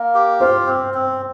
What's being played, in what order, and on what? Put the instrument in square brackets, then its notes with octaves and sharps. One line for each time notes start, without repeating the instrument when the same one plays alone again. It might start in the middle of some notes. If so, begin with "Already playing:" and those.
Already playing: [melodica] A#3
G4
[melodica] F4 [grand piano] C5
[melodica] C4
C4